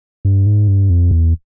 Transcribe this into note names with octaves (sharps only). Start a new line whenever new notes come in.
G2
G#2
G2
F2
E2